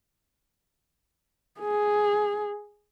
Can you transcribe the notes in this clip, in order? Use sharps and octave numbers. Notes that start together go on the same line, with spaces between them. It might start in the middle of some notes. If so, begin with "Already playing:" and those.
G#4